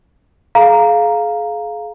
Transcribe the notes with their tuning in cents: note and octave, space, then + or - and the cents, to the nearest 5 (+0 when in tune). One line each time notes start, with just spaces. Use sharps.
G#4 +35 F5 +0 A#5 +0